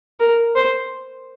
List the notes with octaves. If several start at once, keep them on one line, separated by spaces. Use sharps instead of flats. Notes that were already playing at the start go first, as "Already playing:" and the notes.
A#4
C5